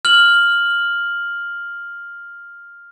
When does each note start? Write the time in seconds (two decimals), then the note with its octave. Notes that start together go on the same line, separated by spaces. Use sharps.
0.05 F6 F#7